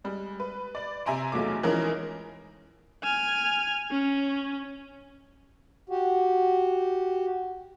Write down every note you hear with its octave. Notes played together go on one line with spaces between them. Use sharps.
G3 G#3
B4
D5 F#7
C3 E5 G#5 A#5 C6 D7
B1 E2 F#3 A3 F4 D6
E3 F3 G#3 C#4 D#4 A#4
G#5 F6
C#4
F#4 G4